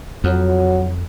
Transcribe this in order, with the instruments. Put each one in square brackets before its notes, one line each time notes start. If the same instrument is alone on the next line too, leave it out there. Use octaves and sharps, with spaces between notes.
[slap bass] F2 [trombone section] F#3